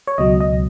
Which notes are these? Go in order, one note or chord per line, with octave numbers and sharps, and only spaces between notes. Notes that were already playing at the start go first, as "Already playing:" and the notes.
C#5
C#2 B2 F#3 D#5
D#5